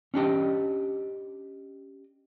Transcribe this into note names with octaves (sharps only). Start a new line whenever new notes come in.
C#4 D4 G4 D#5